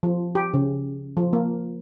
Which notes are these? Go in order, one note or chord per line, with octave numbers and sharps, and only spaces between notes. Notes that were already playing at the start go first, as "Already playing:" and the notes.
F3
G4
C#3
F3
A#3